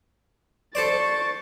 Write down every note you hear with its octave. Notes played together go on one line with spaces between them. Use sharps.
A4 C5 D5 C#6 A6